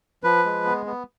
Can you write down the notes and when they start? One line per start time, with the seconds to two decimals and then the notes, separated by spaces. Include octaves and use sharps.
0.24 F3 B4
0.45 G#3
0.65 B3
0.86 B3